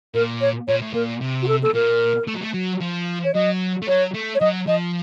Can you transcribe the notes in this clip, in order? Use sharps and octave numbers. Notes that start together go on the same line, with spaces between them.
A#2 A#4
C#5
A#2 C#5
A2
A#2 A#4
C3
F#4
A4
A4
A#2 A#4
A3
F#3
A3
F#3
F3
C#5
F#3 D#5
A3
F#3 C#5
A3
C#5
F#3 D#5
F3 D#5